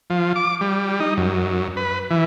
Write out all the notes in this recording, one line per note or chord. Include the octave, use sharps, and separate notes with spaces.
F3
D6
G3
D#4
F#2
B4
E3